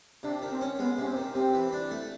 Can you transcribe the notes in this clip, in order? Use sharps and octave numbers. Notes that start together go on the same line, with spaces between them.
C3 D4
D#3
C4
C#4
G#3 B3
C3 C#4
C4
D#3
C3 C4
E3
D4
A3